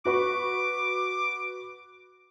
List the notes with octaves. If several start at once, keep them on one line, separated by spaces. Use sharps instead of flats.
F#4 B4 C#6 D6